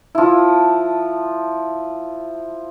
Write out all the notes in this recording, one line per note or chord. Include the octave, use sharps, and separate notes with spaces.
F3 E4